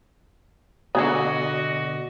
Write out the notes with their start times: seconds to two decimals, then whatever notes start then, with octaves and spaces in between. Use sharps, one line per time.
0.95 B2 D3 B3 F#4 G#4 A4 D5 D#5